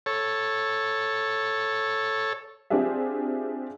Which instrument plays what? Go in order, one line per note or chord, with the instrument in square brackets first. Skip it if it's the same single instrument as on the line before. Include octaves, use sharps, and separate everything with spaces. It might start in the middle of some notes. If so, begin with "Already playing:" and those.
[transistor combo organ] A4 C#5
[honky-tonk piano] C4 D4 F4 G4 G#4 E5